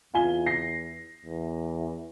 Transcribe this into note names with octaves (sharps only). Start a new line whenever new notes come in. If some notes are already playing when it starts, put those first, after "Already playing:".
E2 F4 G#5 G7
A#6 C7
E2